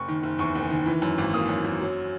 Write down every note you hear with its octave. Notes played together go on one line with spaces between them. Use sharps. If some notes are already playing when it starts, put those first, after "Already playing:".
Already playing: F#1 C#6
D#3
F#1
E2 C#6
F#1
D#3
E3
F#2
G#1
A#3 D#6
F#2
F#2
F#3